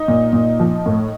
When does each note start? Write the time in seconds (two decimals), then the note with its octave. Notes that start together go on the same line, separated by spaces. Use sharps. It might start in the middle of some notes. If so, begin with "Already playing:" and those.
Already playing: D#4
0.08 A#2
0.33 A#2
0.60 F3
0.86 A2